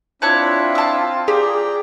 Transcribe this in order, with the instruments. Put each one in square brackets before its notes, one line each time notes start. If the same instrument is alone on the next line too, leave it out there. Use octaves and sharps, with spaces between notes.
[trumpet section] C4 F4 [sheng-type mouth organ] D4 E4 E5 [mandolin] C#5 A5 F#6
[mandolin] A5 E6
[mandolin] G4 [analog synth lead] G#4 [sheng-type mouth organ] D5 G5 A#5